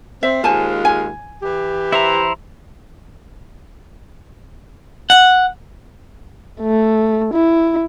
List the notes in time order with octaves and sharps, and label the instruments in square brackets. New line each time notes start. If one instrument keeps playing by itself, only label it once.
[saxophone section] C4 [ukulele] E5
[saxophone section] D#2 G#3 F4 [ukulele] C5 G#5 A5
[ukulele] G#5
[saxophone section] E3 G4
[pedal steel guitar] E4 C5 A#5 [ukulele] E5
[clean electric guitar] F#5
[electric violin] A3
E4